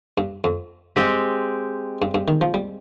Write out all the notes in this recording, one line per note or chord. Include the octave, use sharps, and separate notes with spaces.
G2
F2
G2 G#3 C4 G4
G2
G2
D#3
F3
G3